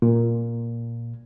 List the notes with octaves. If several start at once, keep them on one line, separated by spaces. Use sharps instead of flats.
A#2